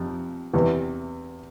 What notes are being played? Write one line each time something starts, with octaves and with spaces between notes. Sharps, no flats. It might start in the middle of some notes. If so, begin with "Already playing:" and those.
Already playing: F2 C3 F3
E2 C3 E3